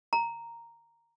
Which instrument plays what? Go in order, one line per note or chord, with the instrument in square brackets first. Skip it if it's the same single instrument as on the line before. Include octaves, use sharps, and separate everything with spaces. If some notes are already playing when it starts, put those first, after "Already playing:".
[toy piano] A#5